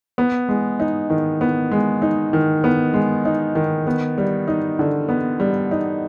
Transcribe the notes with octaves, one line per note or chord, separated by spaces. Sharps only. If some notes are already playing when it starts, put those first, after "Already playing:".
B3
G#3
D#4
D#3
B3
G#3
D#4
D#3
B3
G#3
D#4
D#3
B3
G3
D#4
D3
B3
G3
D#4